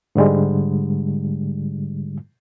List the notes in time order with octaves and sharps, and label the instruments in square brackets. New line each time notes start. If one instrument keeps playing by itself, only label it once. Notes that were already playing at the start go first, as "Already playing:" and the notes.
[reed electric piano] G#2 D3 G3 G#3